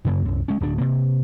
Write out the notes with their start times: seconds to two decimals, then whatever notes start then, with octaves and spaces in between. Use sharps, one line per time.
0.05 F#2 C#3 A#3
0.25 C2 F#2
0.48 G#3 C#4
0.60 D1 D2 D4
0.78 C3 A#3